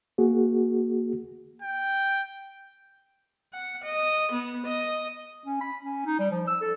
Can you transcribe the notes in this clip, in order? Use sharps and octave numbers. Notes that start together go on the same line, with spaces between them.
A#3 F#4 G#4
G5
F#5
D#5
B3
D#5
C#4
B5
C#4
D#4
G3
F3
E6
A4